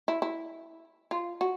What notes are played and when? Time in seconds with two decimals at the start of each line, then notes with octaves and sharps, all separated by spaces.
0.08 E4
0.22 E4
1.11 F4
1.41 F#4